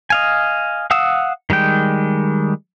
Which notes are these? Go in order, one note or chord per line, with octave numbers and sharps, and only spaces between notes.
D#5 F5 G#5
F5 F#5 D#6 E6
D#3 G3 G#3 G5